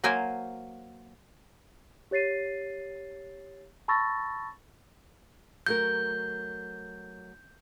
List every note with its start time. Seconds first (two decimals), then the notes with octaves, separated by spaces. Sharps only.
0.04 F#3 A#3 A#4 C5 G#5
2.11 G4 C#5 A6 C7 D#7
3.88 A5 B5 C#6 E6 A6 A#6
5.66 F#3 A3 A#4 G6